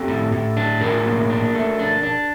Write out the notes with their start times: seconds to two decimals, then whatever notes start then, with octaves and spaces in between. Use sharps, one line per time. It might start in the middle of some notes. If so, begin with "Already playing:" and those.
Already playing: C4 G4 A4
0.08 A2
0.32 A2
0.57 D4
0.81 A2 G#4 A#4
1.05 A#3
1.30 D4
1.55 A3
1.79 D4
2.03 D4